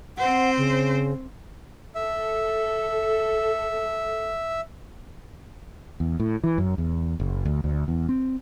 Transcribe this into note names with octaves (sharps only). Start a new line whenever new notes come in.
C4 C5 F#5
C#3
A4 E5
E2
A2
E3
F#2
E2
F#1
D2
D2
E2
C4